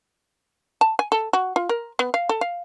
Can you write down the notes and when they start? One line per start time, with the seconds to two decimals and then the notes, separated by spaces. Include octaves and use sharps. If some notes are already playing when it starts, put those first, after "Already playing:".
0.81 A5
0.99 G#5
1.12 A4
1.33 F#4
1.56 F4
1.69 A#4
1.99 B3
2.14 F5
2.29 A4
2.41 F5